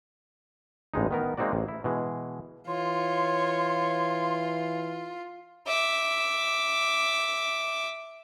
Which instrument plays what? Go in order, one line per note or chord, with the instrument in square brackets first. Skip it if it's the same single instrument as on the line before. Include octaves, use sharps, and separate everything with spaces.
[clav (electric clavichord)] A1 G2 G#3 D#4
D#3 B3 A#4
G#3 A#3 C4 D#4 F#4 D5
A1
E4
B2 E3 G#3
[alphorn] E3 [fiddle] F4 [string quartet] C#5 [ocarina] C6
[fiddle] E5 D6